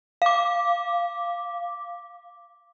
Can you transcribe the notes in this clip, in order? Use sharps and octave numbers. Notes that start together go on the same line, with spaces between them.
F5 D6